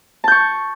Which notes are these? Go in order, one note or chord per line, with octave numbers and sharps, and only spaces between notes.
A5 C#6 G6